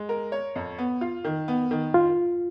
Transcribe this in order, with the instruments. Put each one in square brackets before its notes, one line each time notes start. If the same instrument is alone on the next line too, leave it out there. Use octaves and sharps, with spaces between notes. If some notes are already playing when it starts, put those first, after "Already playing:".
Already playing: [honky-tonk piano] G#3
A#4
C#5
F2
B3
F4
D#3
B3
D#3
[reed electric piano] F4